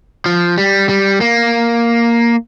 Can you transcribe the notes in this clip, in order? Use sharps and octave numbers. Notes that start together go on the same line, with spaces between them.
F3
G3
G3
A#3